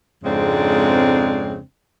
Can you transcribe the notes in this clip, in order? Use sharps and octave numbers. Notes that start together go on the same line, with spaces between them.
F2 G#2 C#3 G#3 C4 D4